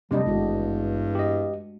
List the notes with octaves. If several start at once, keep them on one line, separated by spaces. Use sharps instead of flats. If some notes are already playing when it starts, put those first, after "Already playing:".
C3 F#3 G3 A3 D4 D#5
G#1 E2 G2 G#3 F#4
G4 D#5